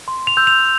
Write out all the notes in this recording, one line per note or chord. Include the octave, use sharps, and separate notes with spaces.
C6
F7
E6 G6
F7